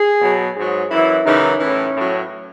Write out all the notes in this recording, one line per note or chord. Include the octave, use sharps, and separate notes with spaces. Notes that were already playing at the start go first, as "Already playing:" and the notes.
Already playing: G#4
B2 F#3
G#2 F#3 G#4
F#2 E3 E4
F#2 C#3 E3 D#4
A2 E3 C#4
A2 F#3